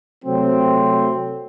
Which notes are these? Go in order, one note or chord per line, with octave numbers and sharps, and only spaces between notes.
C3 F#3 A3 C4